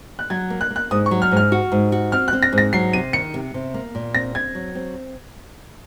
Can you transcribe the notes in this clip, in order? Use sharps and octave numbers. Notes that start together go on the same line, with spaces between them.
F#6
F#3 G#6
A#3
F#6
A#3
F#6
G#2 D#6
C#6
F#3
F6
G#2
F6
F#4
G#2
F#4
C4 F6
F#6
C4
A#6
G#2
A#6
F#3 C7
C3 D#7
D#3 C#7
C3
C3
A#3
A#2
C4 A#6
C4 G#6
F#3
C4